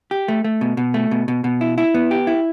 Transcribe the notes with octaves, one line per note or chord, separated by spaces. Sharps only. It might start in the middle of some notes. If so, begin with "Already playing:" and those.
G4
A3
A3
B2
B2
A3
B2
B2
B2
E4
E4
B3
G4
E4